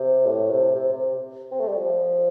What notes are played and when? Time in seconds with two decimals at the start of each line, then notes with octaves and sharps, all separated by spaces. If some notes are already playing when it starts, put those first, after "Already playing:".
Already playing: C3
0.26 A2
0.50 C3
0.75 C3
0.93 C3
1.52 C4
1.60 A3
1.68 G3
1.77 F3